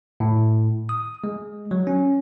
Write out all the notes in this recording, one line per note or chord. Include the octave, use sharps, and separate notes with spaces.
A2
D#6
G#3
F#3
C#4